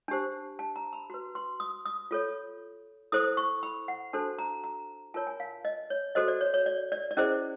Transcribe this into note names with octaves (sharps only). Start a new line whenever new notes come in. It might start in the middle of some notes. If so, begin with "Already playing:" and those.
D4 G4 C5 A5
A5
A#5
B5
F#4 B4 C6
C6
D#6
D#6
F4 A4 C#5
E4 A4 C5 D#6
C#6
B5
F#5
D4 F#4 A4 C5 A5
A#5
A#5
F4 A#4 C#5 A5
G#5
F5
D#5
C#5
F#4 A4 C5 D#5
D5
C#5
C#5
D5
D5
D5
C#4 E4 G#4 C5 D#5